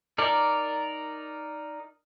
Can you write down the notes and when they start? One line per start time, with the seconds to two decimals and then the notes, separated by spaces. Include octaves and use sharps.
0.18 D#4 A#4 D5